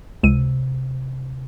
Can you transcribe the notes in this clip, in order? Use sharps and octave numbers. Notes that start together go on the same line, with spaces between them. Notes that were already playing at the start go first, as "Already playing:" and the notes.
C#2 C3 D#7